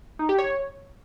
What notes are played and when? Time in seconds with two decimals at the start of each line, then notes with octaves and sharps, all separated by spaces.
0.19 D#4
0.29 G4
0.38 C#5